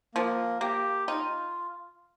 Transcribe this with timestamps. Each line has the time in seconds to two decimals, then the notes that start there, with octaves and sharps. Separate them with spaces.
0.15 F3 A#3
0.61 A#3 G4
1.07 D#4 F4